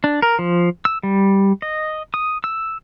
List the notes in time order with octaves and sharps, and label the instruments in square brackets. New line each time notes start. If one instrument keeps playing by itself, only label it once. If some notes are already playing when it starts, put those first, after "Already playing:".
[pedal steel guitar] D4
A#4
F3
E6
G3
D#5
D#6
E6